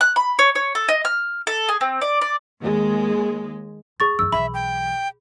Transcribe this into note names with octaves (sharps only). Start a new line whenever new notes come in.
F#6
B5
C#5
C#5
A4
D#5
F6
A4
G#4
C4
D5
D5
D#2 G#3
D2 G#4 C#6 A6
F#2 G#3 E6
B1 E3 E5 B5
G5